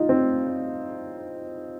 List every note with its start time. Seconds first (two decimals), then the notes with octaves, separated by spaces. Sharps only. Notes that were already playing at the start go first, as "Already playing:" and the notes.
Already playing: D#4 F4
0.09 C4